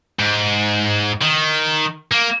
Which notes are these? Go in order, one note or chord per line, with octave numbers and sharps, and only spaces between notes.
G#2
D#3
A#3